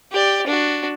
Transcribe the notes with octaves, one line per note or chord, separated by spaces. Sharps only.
G4 D5
D4 F#4